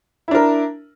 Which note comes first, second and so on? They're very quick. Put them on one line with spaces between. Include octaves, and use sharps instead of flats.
E4 D4 A#4